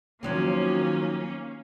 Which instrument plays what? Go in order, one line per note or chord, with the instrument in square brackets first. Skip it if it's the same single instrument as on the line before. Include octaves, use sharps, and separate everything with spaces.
[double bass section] D#3 [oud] F3 F#3 C4 [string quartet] A#3 C#4